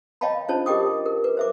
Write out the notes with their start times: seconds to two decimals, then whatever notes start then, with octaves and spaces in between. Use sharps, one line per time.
0.21 C#5 D#5 F5 G5 A5 B5
0.48 C#4 D4 F4 C5 C#5 A5
0.66 G4 A#4 D#5 G5 D6 D#6
1.06 A#4
1.24 B4
1.37 C5 E5 D6